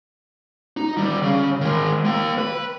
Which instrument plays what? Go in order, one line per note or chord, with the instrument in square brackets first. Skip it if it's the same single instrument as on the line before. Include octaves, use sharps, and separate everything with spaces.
[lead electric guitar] D#4
D#2 G3
C#3
D#3 G#3
A#3 G5
B4